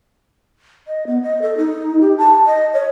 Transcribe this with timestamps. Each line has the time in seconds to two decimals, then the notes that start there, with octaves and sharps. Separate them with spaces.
0.88 D#5
1.07 B3
1.23 D#5
1.42 A4
1.57 D#4
2.01 G4
2.18 A5
2.47 D#5
2.74 C#5